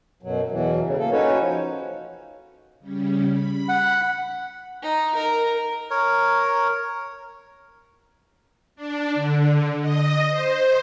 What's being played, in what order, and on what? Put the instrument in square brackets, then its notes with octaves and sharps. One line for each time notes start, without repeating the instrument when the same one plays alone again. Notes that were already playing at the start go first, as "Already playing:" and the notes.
[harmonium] F#2 B2 F#3
E2 B2 E3 F#3
A2 C#3
A#3 A4
C#4 D#4 F#4 B4 C#5
F3
[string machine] C#3 G3 C#4
B5
[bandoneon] F#5
[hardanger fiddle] D#4
A#4
[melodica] A#4 C#5
[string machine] D4
D3
D#5
C5